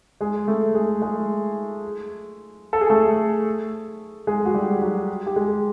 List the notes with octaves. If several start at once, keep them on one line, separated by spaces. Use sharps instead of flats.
G#3 G#4
A3 A4
G#3 G#4
G#3 G#4
A4
G#4
A3 A4
G#3 G#4
F#4
G3 G4
F#3 F#4
G4
G#3 G#4